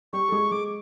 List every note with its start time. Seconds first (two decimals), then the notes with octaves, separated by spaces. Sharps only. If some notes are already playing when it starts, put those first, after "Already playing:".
0.13 G3 G4 C#6
0.28 A4
0.32 G#3 G#4
0.52 G#3 G#4 D6